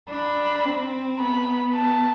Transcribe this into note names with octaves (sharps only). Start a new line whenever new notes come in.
D4 B5
C4
B3 B5
A5